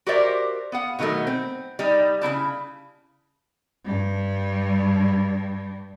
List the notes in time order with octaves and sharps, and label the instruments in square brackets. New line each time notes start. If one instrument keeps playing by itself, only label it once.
[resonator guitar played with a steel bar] F#4 G4 A#4 C5 D5 E5
B3 F5 F#5
B2 D#3 F#3 G#3 A3
C4
G3 D#4
C#3 C4 E4 A5
[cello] G2 G3